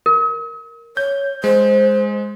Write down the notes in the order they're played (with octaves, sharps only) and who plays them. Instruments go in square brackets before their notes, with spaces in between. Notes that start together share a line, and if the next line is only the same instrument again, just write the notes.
[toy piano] A#4
[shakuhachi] C#5 [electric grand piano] G6
[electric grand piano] G#3 [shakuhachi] C5